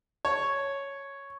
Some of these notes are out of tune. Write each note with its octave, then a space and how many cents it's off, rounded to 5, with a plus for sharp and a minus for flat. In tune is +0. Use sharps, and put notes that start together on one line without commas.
C#5 +0 A5 +0